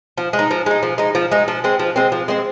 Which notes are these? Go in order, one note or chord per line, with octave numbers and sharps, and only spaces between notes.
F3
G#3
D#4
F3
G#3 D#4
F3
G#3 D#4
F3
G#3 D#4
F3
G#3 C4
F3
G#3 C4
F3
G#3 C4